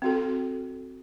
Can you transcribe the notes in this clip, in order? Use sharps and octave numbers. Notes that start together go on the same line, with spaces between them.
C4 F#4 A4